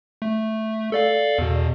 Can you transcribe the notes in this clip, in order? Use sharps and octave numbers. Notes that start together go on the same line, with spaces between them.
A3
A4 D5 F5
E2 B2